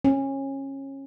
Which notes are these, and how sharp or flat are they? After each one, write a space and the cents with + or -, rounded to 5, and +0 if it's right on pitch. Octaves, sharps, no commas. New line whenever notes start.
C#4 -25